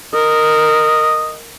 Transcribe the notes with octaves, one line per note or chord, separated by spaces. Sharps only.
A#4 D#5